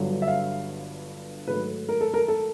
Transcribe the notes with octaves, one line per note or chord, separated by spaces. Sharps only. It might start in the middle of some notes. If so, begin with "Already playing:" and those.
Already playing: G1 G2 D3 F#3
E5
F5
G#2 D#3 F#3 A3 B4
A#4
A4
A#4
A4